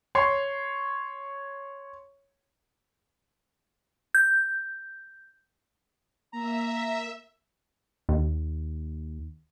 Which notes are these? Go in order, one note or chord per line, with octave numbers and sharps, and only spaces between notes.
C#5 C6
G6
A#3 E5 A#5
D#2